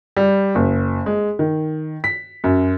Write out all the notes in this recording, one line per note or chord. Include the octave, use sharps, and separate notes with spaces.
G3
F#1
G#3
D#3
B6
F#2